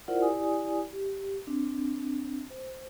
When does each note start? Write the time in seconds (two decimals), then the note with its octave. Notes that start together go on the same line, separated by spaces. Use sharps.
0.08 E4 F4 A#4 C5 D5 F#5
0.21 E4 G4 D5 G#5 D#6
0.93 G4
1.47 C4 D4
2.50 C5